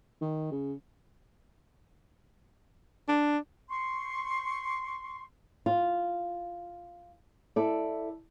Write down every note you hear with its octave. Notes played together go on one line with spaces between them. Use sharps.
D#3
C#3
D4
C6 C#6
F4
E4 A4 D5